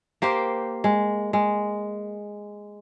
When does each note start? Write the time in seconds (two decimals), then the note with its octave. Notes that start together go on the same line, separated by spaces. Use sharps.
0.22 A#3 G4 C5 G5
0.84 G#3
1.33 G#3